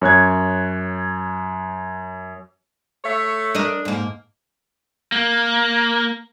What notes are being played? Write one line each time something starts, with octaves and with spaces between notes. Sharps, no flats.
F#2 C#5 F#6 G#6
A3 C#5 E5
D4 A#4 D#5
G#2 A#3
A#3